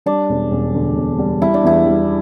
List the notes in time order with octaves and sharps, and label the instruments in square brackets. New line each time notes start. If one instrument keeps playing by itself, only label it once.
[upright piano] G3 [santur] D4
[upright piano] E1
E1
D2
E1
G3
[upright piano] G3 [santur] E4
[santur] D4
[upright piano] E2 [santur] E4
[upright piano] G3